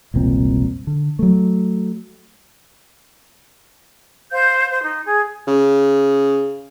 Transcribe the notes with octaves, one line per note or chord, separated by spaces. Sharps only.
E1 C2 A#2 C4
D3
F#3 A3
C5 F5 G6
C5
D#4
G#4
C#3